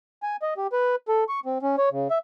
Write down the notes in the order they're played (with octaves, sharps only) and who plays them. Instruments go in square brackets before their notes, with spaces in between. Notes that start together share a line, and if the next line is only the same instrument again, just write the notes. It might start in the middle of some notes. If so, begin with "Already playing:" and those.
[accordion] G#5
D#5
G4
B4
A4
C#6
C4
C#4
C#5
C#3
E5